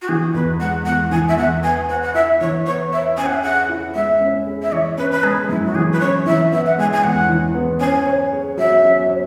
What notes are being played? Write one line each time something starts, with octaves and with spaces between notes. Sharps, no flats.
F#4
E3 G#4
E2 B4
G#3 F#5
E2 F#5
E3 G#5
E5
E2 F#5
B3 G#5
B4 F#5
F#5
E4 E5
E3 C#5
B3 C#5
B4 E5
C#4 G#5
F#5
E5
G#4 F#5
E4
G#3 E5
C#4
G#4
E5
E3 C#5
C#4 B4
B4
G#3 G#4
F#2 E4
F#4
E3 G#4
B4
C#4 C#5
E3 E5
B3 E5
F#5
G#3 G#5
G#5
E2 F#5
E3
B3
C#4 G#5
C#5
G#4
F#3 E5
C#4
C#5